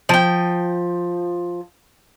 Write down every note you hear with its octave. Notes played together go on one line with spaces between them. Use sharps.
F3 G5